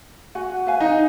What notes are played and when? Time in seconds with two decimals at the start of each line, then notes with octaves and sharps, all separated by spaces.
0.35 F#4 F#5 G#5
0.66 B4 F5 G#5
0.81 D#4